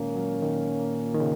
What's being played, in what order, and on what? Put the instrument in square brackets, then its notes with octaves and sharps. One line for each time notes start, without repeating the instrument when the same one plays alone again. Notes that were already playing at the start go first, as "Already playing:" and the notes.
Already playing: [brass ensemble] A#2 A#3 C#4 [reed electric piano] D#3 G#3
[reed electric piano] F#3
D#3
D#3
C#3